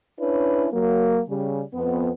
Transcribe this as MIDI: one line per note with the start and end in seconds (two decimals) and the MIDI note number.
0.19 0.68 61
0.19 0.68 62
0.19 0.68 64
0.19 0.68 71
0.19 0.68 73
0.72 1.21 54
0.72 1.21 58
1.28 1.62 49
1.28 1.62 55
1.73 2.10 41
1.73 2.10 59